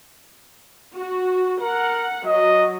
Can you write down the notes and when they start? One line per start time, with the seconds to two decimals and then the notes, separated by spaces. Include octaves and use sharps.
0.95 F#4
1.61 A#4 F#5
2.26 F#3 D#5